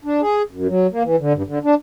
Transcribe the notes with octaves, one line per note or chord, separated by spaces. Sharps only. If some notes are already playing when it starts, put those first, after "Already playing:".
D4
G#4
F#2
F#3
A#3
E3
D3
G2
D3
D4